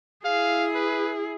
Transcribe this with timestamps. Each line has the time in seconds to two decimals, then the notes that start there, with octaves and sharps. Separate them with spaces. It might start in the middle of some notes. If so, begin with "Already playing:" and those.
0.25 E4 G#4 F5
0.75 B4